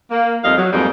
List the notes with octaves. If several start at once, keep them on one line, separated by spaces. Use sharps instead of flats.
A#3
F2 G3 D#4 D#5 F5
F#3
F2 G#2 G3 G#3 A#3